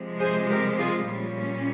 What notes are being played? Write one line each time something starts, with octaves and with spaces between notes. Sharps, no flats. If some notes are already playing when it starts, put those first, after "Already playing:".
Already playing: C3 F3 G#3
G#4 C5
G4 A#4
F4 G#4
A#2 G3 C#4